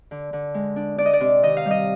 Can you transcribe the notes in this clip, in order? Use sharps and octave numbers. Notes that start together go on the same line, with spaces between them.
D3
D3
G#3
D4
D4 D5
D#5
D5
C3
D#3 D#5
F5
G3
D#5